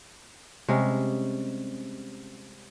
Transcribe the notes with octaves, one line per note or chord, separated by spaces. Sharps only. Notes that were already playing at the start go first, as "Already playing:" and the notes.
C3 G3 G#3 C#4